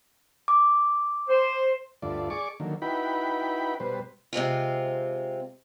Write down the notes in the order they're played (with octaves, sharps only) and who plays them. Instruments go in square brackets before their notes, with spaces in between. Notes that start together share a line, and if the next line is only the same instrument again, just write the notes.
[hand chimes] D6
[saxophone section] C5
[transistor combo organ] D2 G2 A3 F4 D5
G#4 D5 C#6 D6
D3 D#3 F#3 A#3
D#4 E4 F#4 B4 G5 B5
B2 G3 B4 C5
[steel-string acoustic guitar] C3 G#3 C4 F4